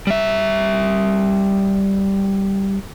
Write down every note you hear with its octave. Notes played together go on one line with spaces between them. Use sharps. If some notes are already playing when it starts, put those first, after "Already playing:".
G3 E5